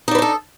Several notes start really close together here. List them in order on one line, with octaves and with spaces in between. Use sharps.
D#4 D4 B4 C5 A4